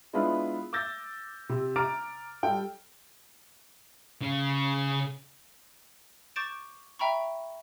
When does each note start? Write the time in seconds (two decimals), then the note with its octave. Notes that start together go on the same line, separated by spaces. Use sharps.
0.13 G#3 B3 D4 E4 F4 B5
0.73 D6 E6 G6 A6 A#6
1.49 C3
1.76 A#5 D6 F6 A6 D7
2.43 G3 A4 G5
4.22 C#3
6.36 C#6 D6 G6 A6 D7 E7
6.99 E5 G5 A#5 B5 C#6